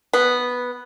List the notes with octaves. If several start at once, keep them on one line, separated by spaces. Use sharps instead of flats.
B3